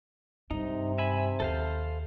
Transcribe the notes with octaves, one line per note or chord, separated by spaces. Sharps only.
G2 C3 D#4
E5 G#5 B5
D#2 A4 C5 F5